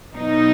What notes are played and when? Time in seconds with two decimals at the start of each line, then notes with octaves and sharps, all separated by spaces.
0.14 B2 F#3 D#4